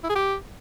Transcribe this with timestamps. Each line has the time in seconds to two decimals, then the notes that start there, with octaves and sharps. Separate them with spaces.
0.04 E4
0.10 G#4
0.15 G4